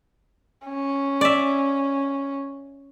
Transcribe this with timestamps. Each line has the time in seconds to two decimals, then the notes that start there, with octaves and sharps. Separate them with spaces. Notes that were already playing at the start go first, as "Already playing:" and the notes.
0.67 C#4
1.21 D5 E5